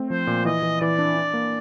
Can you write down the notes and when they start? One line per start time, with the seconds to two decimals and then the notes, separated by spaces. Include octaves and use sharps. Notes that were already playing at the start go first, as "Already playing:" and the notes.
Already playing: A3 C4
0.10 F3 C5
0.27 A#2
0.45 E3 D#5
0.63 E3
0.81 E3 D5
0.99 D4
1.17 D4
1.34 A#3